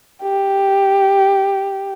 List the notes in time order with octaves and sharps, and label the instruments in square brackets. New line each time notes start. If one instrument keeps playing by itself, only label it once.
[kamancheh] G4